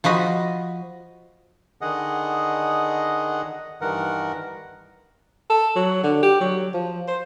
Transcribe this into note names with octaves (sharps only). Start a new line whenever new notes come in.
F3 F#4 D#5 B5
D3 D#3 G#4 D#5 F#5
G2 D#3 E3 A#4 F#5
A4
F#3
D3
G4
F#3
F3
C5